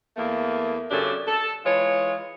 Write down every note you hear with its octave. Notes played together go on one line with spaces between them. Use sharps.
E2 A3 A#3
F#2 C#3 D4 G4 A4
A4
E3 G#3 F4 C#5